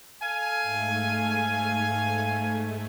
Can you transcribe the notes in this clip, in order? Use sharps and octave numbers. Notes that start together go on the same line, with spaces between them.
A4 F5 G#5
G#2 A3